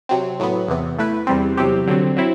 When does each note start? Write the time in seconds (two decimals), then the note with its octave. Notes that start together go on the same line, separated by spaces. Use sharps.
0.09 C3 F#3 C4
0.39 A2 F#3 B3
0.68 E2 C3 E3 B3
0.99 A3 E4 B4
1.27 E2 C3 G3 C4
1.57 E2 C3 F#3 C4 G4
1.87 D3 F#3 C4
2.16 F#3 C4 E4